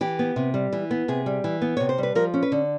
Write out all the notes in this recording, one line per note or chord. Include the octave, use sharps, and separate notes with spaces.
E3 G4
B3
C3
G3
E3
B3
C3 G#4
G3
E3
B3
C3 C#5
C5
G3 B4
F3 A#4
C#4
B4
D3